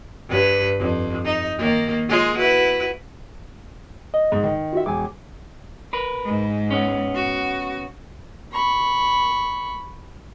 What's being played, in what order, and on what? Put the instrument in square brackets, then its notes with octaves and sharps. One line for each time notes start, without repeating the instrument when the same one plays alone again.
[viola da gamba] G2 B4
F2
D#4
D#3 A#3
G#3 F4 G#4
E4 F#4 B4
[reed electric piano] D#5
[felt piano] G#2
D#3
[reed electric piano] F4 F#4 E5
[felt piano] E1 [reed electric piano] G#5 D6
[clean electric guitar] A#4 B4
[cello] G#2
[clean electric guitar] B3 C#4
[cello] F#4
[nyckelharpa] B5 C#6